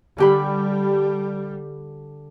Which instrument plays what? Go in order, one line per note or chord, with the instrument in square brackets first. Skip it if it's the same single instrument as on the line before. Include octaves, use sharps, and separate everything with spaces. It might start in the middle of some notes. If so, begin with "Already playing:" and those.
[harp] D3 G4 B5 [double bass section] G3